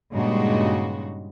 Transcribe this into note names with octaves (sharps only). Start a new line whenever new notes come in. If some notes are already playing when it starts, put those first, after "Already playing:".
G2 A#2 C#3 G#3 D#4 F#4